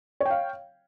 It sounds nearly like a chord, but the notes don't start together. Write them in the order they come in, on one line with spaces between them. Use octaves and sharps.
C#5 G5 F5